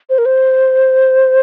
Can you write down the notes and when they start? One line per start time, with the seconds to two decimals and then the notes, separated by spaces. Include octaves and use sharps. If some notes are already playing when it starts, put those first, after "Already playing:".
0.10 C5
0.18 A#4
0.25 C5